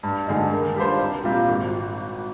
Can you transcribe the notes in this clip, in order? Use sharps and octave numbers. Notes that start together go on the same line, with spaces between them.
G2
D3 G#3 D#4
D#3
G3 D4 F4 C5
C2
A#2 G3 C4 F4
G#1